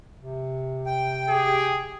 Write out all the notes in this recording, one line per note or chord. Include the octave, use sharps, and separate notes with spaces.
C3
G5
G4 G#4